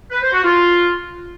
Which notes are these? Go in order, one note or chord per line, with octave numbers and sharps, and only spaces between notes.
B4
C5
F#4
F4